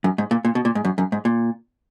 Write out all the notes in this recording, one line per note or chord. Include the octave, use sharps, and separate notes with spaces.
F#2
G#2
A#2
A#2
B2
A#2
G#2
F#2
F#2
G#2
A#2